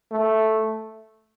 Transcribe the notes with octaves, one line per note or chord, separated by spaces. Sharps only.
A3